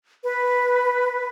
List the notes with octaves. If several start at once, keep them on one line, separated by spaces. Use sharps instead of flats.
B4